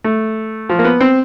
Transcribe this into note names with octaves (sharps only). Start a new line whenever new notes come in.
A3
F3
A#3
B3
C4